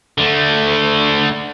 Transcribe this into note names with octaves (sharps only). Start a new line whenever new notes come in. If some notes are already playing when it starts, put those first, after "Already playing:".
D3 A3